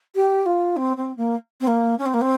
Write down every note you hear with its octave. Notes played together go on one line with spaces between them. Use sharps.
G4
F4
C4
C4
A#3
C4
A#3
C#4
C4
A#3
C4